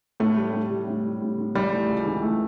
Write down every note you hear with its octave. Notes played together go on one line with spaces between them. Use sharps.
A2 A3
G3
A2
G3
A2
G3
A2
A2
E3 G3
A3
C#2
E3
A3